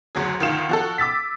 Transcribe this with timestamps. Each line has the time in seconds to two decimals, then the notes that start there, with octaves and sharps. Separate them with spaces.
0.15 F#1 D2 F#3 G#4
0.40 D2 D#3 F4 E7
0.69 F3 F#4 A4
0.98 D6 E6 A6 B6